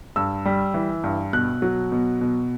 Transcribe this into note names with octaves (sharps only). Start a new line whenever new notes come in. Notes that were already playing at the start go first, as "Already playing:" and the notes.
G2 E6
G3
E3
G2
B2 F#6
F#3
B2
B2